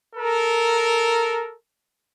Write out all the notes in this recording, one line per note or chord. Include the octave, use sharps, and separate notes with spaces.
A4 A#4